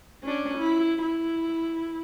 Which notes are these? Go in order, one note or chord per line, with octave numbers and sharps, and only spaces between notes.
C#4 D4
E4
E4